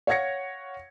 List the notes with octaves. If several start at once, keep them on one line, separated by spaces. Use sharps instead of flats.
C#5 F5 F#5 G#6 A#6 C#7